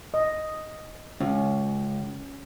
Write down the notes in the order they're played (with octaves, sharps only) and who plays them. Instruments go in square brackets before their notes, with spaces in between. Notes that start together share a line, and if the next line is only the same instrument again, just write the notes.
[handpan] D#5
[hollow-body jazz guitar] C#2 [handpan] C#4